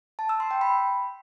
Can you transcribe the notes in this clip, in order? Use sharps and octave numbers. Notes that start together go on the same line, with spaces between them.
A5
E6
C6
G5
B5